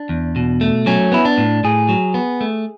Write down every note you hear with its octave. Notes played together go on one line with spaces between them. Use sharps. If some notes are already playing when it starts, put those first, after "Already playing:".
Already playing: D4
E2
B2
A3
F#3 C#4
B3 E4
D4
A2
A2 G#4
F#3
B3
A3